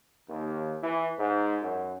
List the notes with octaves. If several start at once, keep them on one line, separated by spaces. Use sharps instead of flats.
D#2
E3
G#2
F#2